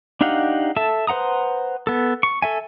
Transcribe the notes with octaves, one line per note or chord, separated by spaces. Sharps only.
D4 D#4 G4 F5 F#5
A4 E5 A5 E6
B4 C5 F#5 A#5 D#6
B3 A4
C#6
A4 E5 G#5